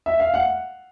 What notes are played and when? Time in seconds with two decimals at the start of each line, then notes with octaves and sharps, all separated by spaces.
0.06 E5
0.20 F5
0.34 F#5